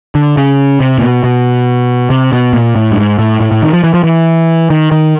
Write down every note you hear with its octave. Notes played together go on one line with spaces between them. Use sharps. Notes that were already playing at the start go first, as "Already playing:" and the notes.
D3
C#3
C3
A#2
B2
B2
C3
B2
A#2
A2
G2
G#2
A2
A2
A2
D#3
F3
E3
F3
E3
D#3
D#3